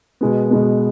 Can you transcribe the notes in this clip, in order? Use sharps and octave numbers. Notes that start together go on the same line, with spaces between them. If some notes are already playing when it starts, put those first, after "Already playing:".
B2 G#3 B3
B2 G#3 B3